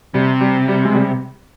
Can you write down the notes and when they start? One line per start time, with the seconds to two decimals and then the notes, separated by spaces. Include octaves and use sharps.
0.14 C3 G3
0.41 G3
0.68 G3
0.85 G#3
0.95 G3